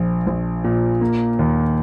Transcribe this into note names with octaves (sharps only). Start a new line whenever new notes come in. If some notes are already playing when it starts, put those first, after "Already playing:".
Already playing: A#1 F3
A#1
A#2
A#3
D#2